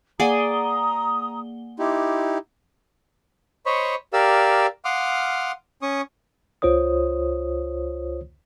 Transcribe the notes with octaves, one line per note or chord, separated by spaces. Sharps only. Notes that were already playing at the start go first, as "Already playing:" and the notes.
A#3 G#4 D5 F#5 A#5 D#6 G7
D#4 E4 G4 C6 D6
C5 C#5 D#5 B5 C#6
G4 A#4 D5 F5 E6
F5 F#5 C6 D6 D#6 F6
C#4 C#6 D#6
C#2 F4 C5 C#5 D#6